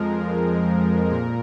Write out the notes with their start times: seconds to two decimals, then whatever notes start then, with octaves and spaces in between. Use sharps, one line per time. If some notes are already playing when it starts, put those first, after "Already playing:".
Already playing: F2 F3 G#3 A#4
1.10 A#2 A#4